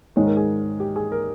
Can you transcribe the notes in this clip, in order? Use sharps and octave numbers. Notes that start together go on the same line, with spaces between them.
G#2 D#3 G#3 D#4 C#5
A#4
G#4
G4
G#4
A#4